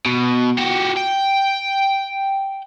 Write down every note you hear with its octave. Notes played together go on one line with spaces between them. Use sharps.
B2
F#4 G4
G5